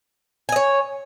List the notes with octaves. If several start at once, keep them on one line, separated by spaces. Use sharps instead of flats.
C#5 D#5 G#5